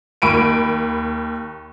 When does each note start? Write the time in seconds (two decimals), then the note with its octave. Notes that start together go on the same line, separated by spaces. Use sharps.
0.22 D#2 B5 D7 D#7